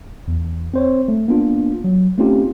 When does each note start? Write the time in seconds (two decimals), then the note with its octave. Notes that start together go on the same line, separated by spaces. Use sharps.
0.28 E2
0.74 C4 C5 C#5
1.08 A3
1.28 A#3 B3 D4 F4
1.84 F#3
2.18 A3 C4 C#4 D#4 F4 G4